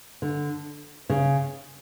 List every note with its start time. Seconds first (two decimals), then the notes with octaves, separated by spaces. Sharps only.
0.22 D3
1.09 C#3